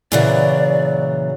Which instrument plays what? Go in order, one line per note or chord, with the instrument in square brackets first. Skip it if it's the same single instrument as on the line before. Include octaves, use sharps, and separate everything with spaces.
[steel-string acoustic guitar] A#2 E3 F#3 [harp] C#3 [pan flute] D5